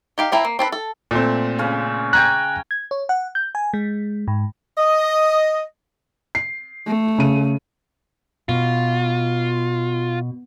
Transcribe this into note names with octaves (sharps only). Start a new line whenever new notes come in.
D#4 G4 F5
F3 C4 E4 A#5
A#3
C4 A4 B4
A4
A#2 A3 C4
C#3 C#4
G5 G#5 A#5 F#6
G#6
C#5
F#5
G6
G#5
G#3
G#2
D#5
C7
A3
C#3 D#7
B2 F4